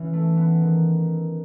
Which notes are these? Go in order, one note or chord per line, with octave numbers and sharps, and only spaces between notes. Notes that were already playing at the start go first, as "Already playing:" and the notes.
Already playing: E3 C#4
A3
B3
D#3